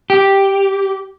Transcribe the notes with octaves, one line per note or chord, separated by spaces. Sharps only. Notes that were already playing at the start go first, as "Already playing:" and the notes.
G4